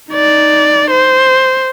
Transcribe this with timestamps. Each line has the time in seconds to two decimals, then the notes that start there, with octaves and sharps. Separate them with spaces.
0.12 D#4 D5
0.91 C5